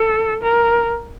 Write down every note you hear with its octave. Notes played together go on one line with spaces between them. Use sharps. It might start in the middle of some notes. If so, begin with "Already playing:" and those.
Already playing: A4
A#4